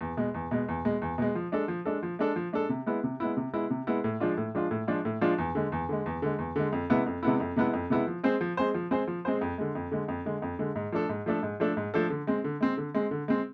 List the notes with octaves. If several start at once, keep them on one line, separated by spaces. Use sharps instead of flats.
E2
B2 G#3
E2
B2 G#3
E2
B2 G#3
E2
B2 G#3
F3
G#3 D4 A4
F3
G#3 D4 A4
F3
G#3 D4 A4
F3
G#3 D4 A4
C3
G#3 B3 E4
C3
G#3 B3 E4
C3
G#3 B3 E4
C3
G#3 B3 E4
A2
F3 G#3 D4 F4
A2
F3 G#3 D4 F4
A2
F3 G#3 D4 F4
A2
F3 G#3 D4 F4
E2
D3 G#3
E2
D3 G#3
E2
D3 G#3
E2
D3 G#3
F2
C3 G#3 B3 E4
F2
C3 G#3 B3 E4
F2
C3 G#3 B3 E4
F2
C3 G#3 B3 E4
F3
G#3 C4 G#4 C5
F3
G#3 C4 G#4 C5
F3
G#3 C4 G#4 C5
F3
G#3 C4 G#4 C5
F2
D3 G#3
F2
D3 G#3
F2
D3 G#3
F2
D3 G#3
G#2
F3 A3 D4 A4
G#2
F3 A3 D4 A4
G#2
F3 A3 D4 A4
G#2
F3 A3 D4 A4
D3
G#3 C4
D3
G#3 C4
D3
G#3 C4
D3
G#3 C4